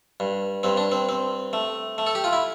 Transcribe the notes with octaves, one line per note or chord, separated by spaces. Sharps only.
G2
G2 C4
D4
C4
C4
A3
A3
A4
G4
F4
E4